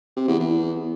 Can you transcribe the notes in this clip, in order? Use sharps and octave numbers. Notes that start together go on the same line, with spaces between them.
C3
E2
E2